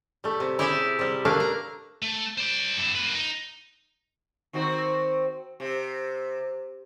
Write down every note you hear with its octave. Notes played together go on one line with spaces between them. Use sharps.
G3 A3
C3
E4 G4 G#4 D5 E5
C3 G3
A3 A#3 D4 A#4 B4 F5
A#5
A3
C5 D5
G2 E4
A#3 B4
D#4
D#3 C4 F#4
C3